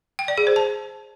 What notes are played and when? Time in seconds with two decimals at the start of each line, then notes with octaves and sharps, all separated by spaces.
0.19 G5
0.28 D5
0.38 G#4
0.47 C5
0.56 A5